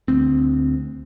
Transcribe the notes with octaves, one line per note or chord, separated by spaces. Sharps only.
D2 C4